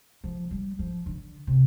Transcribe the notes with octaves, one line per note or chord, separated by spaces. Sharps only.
F3
G3
F3
D3
C3